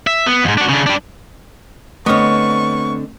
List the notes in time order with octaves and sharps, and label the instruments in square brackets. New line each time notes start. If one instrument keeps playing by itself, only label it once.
[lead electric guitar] E5
B3
F2 G#2
D4 F#4
C#3 D4
G3 D4
[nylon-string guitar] D3 C4 D#5 [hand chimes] A3 F6 [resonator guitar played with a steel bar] B3 C#5 [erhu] C#6